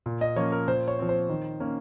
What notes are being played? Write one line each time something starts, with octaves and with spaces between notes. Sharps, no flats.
A#2
D#5
F3 A#3 C#4 C#5
A#4
A#2 C5
C#5
F3 C4
C5
D#3
A#3 C#4